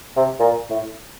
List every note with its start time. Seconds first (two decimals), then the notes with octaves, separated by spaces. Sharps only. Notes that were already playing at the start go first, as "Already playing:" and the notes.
0.16 C3
0.40 A#2
0.70 A2